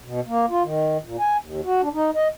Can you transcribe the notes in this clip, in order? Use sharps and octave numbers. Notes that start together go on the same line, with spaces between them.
B2
A#3
F4
D#3
A#2
G#5
D#2
F#4
D4
D#4
D#5